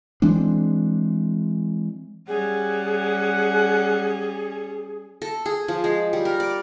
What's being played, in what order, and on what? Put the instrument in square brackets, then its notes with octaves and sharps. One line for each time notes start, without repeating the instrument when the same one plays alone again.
[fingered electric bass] E3 G#3 C4 D4
[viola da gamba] G3 C#4 [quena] G#4 [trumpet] F#5
[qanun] A4
G#4
F3
G#3
G3
A#4
D5